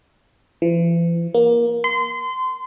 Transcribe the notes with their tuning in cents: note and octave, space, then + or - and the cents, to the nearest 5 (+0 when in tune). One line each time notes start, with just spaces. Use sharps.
E3 +45
A#3 +20
C6 -30